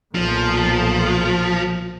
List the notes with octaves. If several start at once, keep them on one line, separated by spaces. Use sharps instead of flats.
B1 A#2 F3